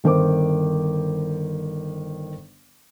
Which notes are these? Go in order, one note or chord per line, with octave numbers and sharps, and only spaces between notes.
G1 D#3 C5 D6